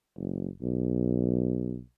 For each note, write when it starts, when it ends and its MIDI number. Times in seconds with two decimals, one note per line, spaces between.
0.17 0.48 30
0.62 1.78 35